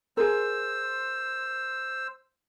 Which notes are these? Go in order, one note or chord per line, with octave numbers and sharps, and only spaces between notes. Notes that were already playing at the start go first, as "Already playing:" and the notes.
G#4 A#4 C5 E6